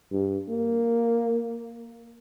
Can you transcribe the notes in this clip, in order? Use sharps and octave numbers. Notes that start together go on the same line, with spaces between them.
G2
A#3